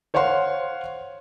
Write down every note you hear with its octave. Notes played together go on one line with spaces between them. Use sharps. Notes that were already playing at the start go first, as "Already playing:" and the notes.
C5 C#5 F5 F#5 C6